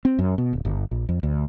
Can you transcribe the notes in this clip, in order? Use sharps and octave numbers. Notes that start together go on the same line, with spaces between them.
C4
F#2
B2
D1
G1
A#1
F2
D2